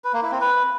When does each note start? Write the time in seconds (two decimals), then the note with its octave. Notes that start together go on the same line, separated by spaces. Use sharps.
0.04 B4
0.13 A#3
0.23 E4
0.32 C4
0.41 B4